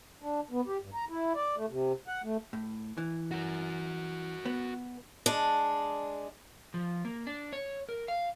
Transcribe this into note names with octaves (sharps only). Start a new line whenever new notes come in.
D4
B3
G4
G2
A#5
E4
D5
A3
C3
F#5
A3
A2
E3
F#4 A#4
B3
G#3 D4
F3
A#3
D4
C#5
A#4
F5